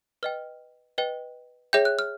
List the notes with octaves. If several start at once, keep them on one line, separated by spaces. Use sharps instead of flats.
B4 D#5 G5 F6
B4 D#5 G5
G#4 C#5 E5 G5 G6
F#6
F6